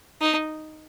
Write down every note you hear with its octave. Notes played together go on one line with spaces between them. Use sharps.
D#4